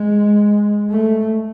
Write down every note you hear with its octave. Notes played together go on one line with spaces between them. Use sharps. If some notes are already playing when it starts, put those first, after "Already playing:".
Already playing: G#3
A3